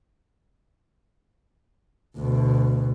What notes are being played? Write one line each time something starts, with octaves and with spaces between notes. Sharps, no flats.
D2 B2